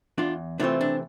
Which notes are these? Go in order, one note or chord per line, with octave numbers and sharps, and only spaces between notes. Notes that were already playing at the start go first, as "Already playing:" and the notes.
E2 D4 F4
C3 E3 A3 C4 D4 F4
D4